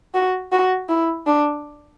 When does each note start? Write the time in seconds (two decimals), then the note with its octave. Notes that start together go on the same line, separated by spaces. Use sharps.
0.14 F#4
0.52 F#4
0.89 E4
1.26 D4